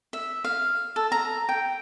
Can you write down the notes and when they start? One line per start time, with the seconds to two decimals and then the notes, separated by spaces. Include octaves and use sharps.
0.13 E5
0.44 F5
0.96 A4
1.12 A#5
1.49 G5